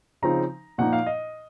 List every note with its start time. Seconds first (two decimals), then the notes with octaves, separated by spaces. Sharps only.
0.22 C#3 F3 C4 D#4 A#5
0.78 A#2 F3 A#3 D#4 F#5
0.93 F5
1.06 D#5